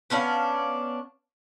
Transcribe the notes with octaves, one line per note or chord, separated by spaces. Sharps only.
B3 C#4 D4 F5